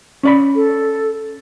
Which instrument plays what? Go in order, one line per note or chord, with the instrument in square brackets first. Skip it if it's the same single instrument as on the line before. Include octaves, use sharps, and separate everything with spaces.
[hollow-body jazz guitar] C#4 D5 B5
[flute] A4